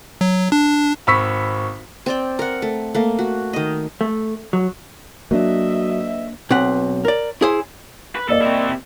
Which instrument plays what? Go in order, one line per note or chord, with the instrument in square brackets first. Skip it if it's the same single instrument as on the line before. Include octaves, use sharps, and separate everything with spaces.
[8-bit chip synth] F#3
D4
[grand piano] G#1 B5 C#6 E6 B6
[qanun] C4 D5 G5
A#4 F#5
A3
A3 A#3
F#4
D#3 D#5
[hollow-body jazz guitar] A3
F#3
[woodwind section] D2 D#5 E5 [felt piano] F#3 [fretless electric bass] A#3 D4
[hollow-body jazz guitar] B1 C4 B4 F#5
A#4 D5
E4 G#4 C5
[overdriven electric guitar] B4
[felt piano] A#3 D5 D#5 [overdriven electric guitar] A4
[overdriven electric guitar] C3 E4